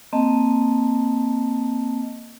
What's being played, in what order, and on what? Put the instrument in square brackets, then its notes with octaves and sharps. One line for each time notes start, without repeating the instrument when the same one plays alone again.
[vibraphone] A#3 C4 D#5 A5